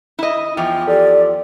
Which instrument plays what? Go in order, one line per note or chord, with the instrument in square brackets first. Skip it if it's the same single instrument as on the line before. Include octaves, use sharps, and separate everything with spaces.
[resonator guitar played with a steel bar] E4 D#5
[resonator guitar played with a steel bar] E2 F3 [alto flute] G5
[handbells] G4 A4 [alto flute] D5